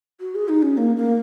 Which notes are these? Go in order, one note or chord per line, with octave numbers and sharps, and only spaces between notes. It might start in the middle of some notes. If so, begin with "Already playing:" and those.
F#4
G#4
D#4
C#4
A#3
A#3